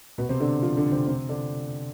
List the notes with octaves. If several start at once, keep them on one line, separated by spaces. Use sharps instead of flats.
B2 B3
C3 C4
D3 D4
F3 F4
D3 D4
C3 C4
C3 C4
D3 D4